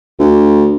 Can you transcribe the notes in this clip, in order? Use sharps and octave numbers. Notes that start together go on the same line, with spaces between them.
D2